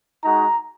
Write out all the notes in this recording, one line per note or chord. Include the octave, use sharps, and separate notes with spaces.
G#3 D#4 F#4 A#5